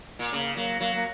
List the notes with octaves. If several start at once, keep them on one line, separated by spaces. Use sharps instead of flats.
A#2
C#3 A#3
F#3 A#3
F#3 A#3
A#3